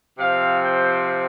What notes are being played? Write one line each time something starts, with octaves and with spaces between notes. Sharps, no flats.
C3 F3 C4 F5
G5